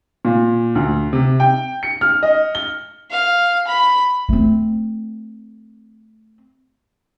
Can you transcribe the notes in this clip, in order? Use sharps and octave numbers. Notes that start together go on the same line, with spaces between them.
A#2
D2
C3
G5
C#7
F6
D#5
G7
F5
B5
A3 C4